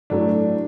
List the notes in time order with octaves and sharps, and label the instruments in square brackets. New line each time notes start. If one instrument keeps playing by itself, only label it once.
[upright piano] A2 F#3 A3 D4